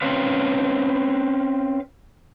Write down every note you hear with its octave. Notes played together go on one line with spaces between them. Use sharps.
C4 C#4 B4 C5 F5